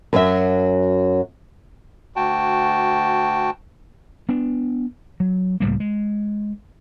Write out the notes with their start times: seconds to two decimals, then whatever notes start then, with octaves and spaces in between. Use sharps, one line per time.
0.13 F#2 F#3 E5
2.16 D2 F#4 G5 A5
4.29 B3 D4
5.20 F#3
5.60 C#2 A2 G3 A#3
5.80 G#3